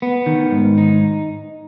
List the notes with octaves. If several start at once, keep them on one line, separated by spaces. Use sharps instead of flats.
B3
D#3
G#2
D#4